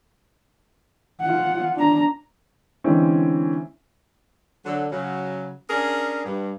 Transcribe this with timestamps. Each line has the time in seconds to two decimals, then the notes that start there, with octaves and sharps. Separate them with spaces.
1.21 F4 F#5
1.75 D4 A#5
2.84 D3 E3 G#3 C4 C#4
4.65 D3 F#3
4.91 C#3 F#3
5.70 C#4 D4 G#4 A#4
6.24 G2